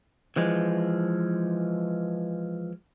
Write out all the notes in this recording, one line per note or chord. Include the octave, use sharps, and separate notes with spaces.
E3 F3 G#3